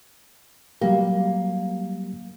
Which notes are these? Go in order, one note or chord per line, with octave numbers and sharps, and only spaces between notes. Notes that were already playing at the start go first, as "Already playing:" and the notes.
F#3 G3 A#3 G4